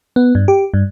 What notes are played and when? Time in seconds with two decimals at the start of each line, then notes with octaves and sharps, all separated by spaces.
0.16 B3
0.35 G2
0.48 G4
0.74 G2